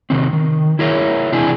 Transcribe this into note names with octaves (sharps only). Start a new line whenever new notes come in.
C3 D#3 C4
D#3
E4 G#4 A#4 C#5 D5 E5
C3 E3 D4 E4 G#4 G#5